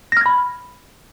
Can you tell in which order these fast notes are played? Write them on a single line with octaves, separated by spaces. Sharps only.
A#6 F6 G#6 B5